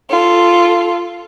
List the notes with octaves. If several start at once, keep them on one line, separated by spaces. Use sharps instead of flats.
F4 A4